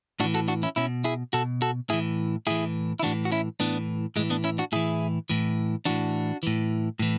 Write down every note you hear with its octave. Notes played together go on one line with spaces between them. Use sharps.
A2 E3 D4 F#4
F#4 A4
D4 F#4
C#4 E4
B2 C#4 E4
E4 G#4
B2 F#4 A4
F#4 A4
A2 E3 E4 G#4
A2 E3 E4 G#4
E4
A2 E3 D4 F#4
F#4
C#4 E4
A2 E3 B3 D4
A2 E3 G#3
B3 D4
C#4 E4
D4 F#4
A2 E3 E4 G#4
A2 E3
A2 E3 D4 F#4
A2 E3
A2 E3